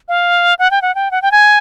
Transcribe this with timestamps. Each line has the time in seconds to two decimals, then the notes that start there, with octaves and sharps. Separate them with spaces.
0.09 F5
0.59 F#5
0.71 G5
0.82 F#5
0.95 G5
1.11 F#5
1.22 G5
1.32 G#5